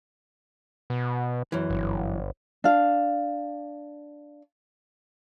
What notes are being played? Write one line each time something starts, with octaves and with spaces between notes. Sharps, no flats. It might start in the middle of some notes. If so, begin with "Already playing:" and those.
B2
F#2 E3
G1
D4 F5